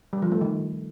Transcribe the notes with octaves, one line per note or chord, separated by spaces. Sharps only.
G3
F3
A3
D#3